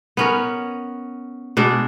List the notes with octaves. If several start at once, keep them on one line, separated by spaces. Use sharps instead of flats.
B3 C#4 A#4
B2 G#3 D4